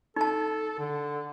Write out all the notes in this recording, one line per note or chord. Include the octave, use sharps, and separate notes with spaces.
D#4 A4 A5
D3